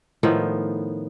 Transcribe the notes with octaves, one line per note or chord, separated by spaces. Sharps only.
A2 D#3 F3 B3